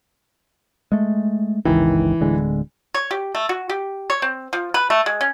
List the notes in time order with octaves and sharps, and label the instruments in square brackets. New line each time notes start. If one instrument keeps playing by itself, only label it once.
[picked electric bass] G#3 A3
[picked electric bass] G1 C#2 D#3 [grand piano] E3
[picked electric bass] D1 D3 G#3
[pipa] C#5
G4
A3
F#4
G4
C#5
C4
F3
B4
A3
G#3
C#4